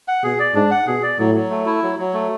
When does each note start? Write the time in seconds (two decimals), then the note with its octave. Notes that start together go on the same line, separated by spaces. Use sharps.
0.08 F#5
0.24 B2 G#4
0.40 D5
0.55 G#2 D4
0.71 F#5
0.87 B2 G#4
1.03 D5
1.19 A2 F#3
1.35 F#3
1.51 A3
1.66 E4
1.83 F#3
1.98 F#3
2.14 A3